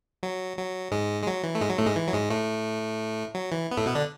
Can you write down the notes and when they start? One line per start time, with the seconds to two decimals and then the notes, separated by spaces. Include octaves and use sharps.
0.23 F#3
0.57 F#3
0.92 G#2 G#3
1.23 G#3
1.27 F#3
1.43 E3
1.55 A3
1.61 G#2 G#3
1.70 F#3
1.78 A2 A3
1.87 G#2 G#3
1.96 E3
2.08 F#3
2.13 G#2 G#3
2.30 A2 A3
3.35 F#3
3.52 E3
3.71 B3
3.77 A2 A3
3.86 B2 B3
3.95 D3 D4